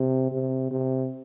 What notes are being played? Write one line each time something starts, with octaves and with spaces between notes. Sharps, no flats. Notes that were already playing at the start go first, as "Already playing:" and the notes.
Already playing: C3
C3
C3